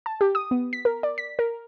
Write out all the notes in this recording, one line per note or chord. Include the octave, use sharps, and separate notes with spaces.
A5
G4
D#6
B3
B6
A#4
D5
B6
A#4